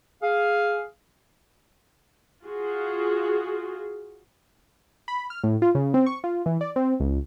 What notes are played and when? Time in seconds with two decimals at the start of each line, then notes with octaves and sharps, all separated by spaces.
0.22 G#4 F5
2.43 F4 F#4 G#4
5.08 B5
5.30 F6
5.43 A2
5.62 F4
5.75 C#3
5.94 C4
6.06 C#6
6.24 F4
6.46 E3
6.61 D5
6.76 C4
7.00 C#2